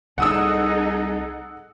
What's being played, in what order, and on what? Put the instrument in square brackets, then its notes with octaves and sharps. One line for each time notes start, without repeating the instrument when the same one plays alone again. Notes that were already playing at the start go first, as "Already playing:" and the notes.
[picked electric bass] C2 [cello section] D#4 G#4 A4 [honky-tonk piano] F#5 D#6 E6